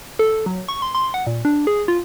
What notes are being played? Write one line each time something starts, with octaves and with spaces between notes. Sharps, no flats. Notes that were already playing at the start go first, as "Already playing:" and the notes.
A4
F#3
C#6
C6
C6
F#5
A#2
D4
G#4
F4